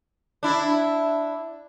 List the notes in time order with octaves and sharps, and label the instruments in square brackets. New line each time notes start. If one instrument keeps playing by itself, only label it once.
[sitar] D4 E4